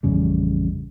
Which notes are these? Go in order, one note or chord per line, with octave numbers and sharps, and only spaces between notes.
A1 F2 C#3 G3